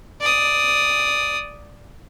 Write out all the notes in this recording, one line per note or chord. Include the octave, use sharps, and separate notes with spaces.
D5 D#6